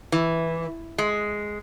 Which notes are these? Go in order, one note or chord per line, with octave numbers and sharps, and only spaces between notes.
E3
G#3